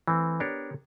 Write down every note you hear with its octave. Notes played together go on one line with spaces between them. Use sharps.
E3 A3 C4
B3 D4 G4 A#4 C#5